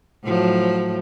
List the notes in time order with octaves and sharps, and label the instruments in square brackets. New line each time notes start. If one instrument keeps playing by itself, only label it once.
[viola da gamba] A2 F3 F#3